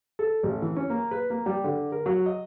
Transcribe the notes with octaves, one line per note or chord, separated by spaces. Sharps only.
A4
A1
E3
C#4
A#3
B4
A#3
G3
D3
A#4
F#3
D#5